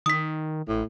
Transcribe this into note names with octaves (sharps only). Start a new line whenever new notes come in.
D#3 D#6 B6
A1 A2